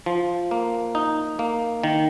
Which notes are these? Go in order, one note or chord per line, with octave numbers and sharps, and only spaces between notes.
F3
A#3
D#4
A#3
D#3